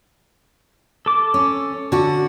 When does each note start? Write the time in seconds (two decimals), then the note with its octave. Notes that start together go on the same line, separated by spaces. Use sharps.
1.06 A4 D6
1.34 C#4
1.92 D3 F#4